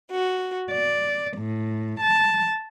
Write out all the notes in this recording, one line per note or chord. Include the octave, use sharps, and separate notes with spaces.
F#4
D5
A2
A5